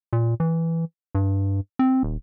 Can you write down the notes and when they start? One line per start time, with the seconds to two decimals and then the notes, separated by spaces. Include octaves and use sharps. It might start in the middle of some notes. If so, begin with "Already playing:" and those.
0.13 A#2
0.40 E3
1.15 G2
1.79 C4
2.03 D#1